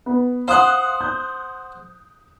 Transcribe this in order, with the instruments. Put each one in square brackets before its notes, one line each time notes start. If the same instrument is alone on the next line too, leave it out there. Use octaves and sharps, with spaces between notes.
[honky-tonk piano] B3
[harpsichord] C5 F#5 [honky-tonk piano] F5 D#6 F#6
[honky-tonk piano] G6